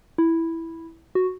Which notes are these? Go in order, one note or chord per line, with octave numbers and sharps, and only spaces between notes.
E4
F#4